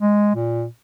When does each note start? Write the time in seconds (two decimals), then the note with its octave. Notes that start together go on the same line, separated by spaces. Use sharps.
0.01 G#3
0.35 A#2